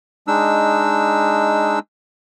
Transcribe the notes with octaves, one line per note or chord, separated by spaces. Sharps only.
G#3 D4 D#4 E6